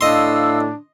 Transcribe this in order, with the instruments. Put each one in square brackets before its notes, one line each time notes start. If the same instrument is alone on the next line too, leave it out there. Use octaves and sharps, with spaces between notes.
[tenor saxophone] A2 [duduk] D4 [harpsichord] D#5 C6 [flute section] F5 E6